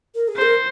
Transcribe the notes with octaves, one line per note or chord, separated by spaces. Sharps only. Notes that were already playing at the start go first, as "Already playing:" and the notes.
A#4
G#4
C5
A#4